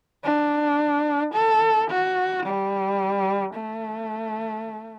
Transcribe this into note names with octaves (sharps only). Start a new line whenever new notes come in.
D4
A4
F#4
G3
A3